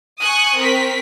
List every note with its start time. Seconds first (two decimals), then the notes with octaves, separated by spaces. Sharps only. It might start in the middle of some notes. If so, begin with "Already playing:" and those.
0.20 G#5 C#6 D#6 F#6
0.57 C4 A#4 B6